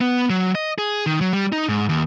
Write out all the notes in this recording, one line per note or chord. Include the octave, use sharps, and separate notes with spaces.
B3
F#3
D#5
G#4
D#3
F#3
G3
D#4
G#2
D#2